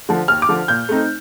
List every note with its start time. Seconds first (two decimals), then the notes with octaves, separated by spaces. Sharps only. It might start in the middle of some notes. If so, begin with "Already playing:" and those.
0.09 D3 F3
0.28 D#2 F6
0.42 D6
0.49 D3 F3
0.68 A#2 G6
0.89 A3 C4 D#4